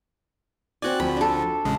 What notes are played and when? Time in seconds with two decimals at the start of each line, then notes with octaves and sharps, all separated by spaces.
0.82 C4 F#4 D5 G#5 F#6
1.00 D2 F3 B5
1.17 D4 A4
1.65 A1 C#3 G#3